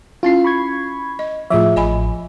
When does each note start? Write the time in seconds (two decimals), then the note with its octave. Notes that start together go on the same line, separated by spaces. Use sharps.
0.23 C#4 E4 F4 C7
0.44 B5 C#6 G#6
1.19 D#5
1.50 A2 F3 F4 G#4 E5
1.76 A1 D#5 G#5 B5